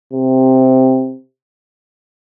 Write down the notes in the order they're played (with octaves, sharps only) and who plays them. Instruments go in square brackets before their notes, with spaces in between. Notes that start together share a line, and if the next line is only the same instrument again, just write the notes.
[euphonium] C3